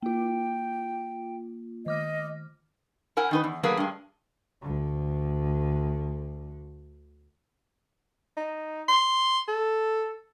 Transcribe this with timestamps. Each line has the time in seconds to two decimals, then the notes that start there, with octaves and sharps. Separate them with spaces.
0.03 A#3 F4 G5
1.86 D#3 D#5 D6 F6
3.17 E4 A#4 F#5 G#5
3.31 D#3 D#4 B4
3.44 E2
3.63 F#3 A3 A#3 G#4 B4
3.77 G2 G#3
4.62 D2 D3
8.37 D#4
8.88 C6
9.48 A4